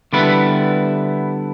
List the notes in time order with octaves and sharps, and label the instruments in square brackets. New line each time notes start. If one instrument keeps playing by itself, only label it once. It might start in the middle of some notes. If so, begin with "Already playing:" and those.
[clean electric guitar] D3 G3 B3 E4 B4